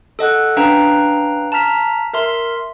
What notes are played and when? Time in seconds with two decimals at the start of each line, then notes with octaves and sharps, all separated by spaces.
0.19 A4 D#5 F#5 F#6
0.56 C#4 D4 B4 F5 G5 A#5
1.52 A5 A#5 F6 B6
2.13 A#4 E5 C6